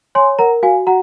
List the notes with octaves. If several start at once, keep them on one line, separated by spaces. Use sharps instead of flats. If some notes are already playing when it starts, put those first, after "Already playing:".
C#5 G#5 C6
A#4 F#5 A#5
F#4 F5 G#5
F#4 F#5 A#5